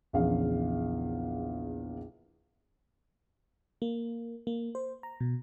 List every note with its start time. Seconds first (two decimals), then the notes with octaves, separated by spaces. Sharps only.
0.13 A#1 E2 C#3 F5
3.82 A#3
4.47 A#3
4.75 C5
5.03 A#5
5.20 B2